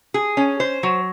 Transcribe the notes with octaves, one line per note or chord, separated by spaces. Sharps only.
G#4
C#4
C5
F#3